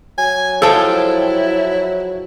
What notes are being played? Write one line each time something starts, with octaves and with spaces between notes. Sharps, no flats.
F#3 G#5
F3 G#3 E4 A4 G5 A5